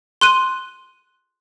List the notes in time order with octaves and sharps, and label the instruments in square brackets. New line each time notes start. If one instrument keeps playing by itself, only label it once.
[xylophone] C6 F#6 D#7